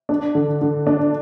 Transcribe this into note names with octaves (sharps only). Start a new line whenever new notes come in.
D4
D3
D3
D4